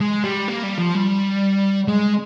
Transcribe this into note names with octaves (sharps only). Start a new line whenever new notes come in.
G#3
G3
A#3
G3
F3
G3
G#3